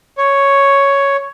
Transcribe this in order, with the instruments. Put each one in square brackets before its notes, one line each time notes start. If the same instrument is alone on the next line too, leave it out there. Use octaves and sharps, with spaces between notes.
[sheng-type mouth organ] C#5